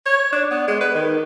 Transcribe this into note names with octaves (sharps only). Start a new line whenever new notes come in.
C#5
D4
B3
G#3
B4
D#3